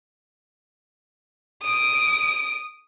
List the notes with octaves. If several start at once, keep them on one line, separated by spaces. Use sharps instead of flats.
D#6 D7